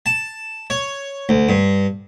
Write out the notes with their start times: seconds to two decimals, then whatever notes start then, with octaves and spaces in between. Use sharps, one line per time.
0.06 A5
0.70 C#5
1.29 D2
1.49 G2